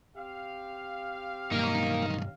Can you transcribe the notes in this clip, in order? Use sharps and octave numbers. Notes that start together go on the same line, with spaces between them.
C4 G4 F5
B1 G2 A#3 D#4 A#4